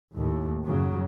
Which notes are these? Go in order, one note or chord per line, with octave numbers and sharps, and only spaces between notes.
D#2 A2
F#2 C#3 F#3